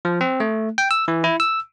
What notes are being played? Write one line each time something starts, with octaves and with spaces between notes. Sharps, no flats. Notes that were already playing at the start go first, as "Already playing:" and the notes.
F3
C4
A3
G5
E6
E3
E4
E6